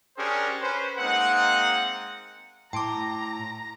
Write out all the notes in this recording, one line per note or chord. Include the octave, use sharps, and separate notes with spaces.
C#4 D4 G4 G#4 A#4 C5
C#4 B4 C5
G#3 A#3 C4 D#4 F#5
A2 G5 A5 A#5 C6 D6 D7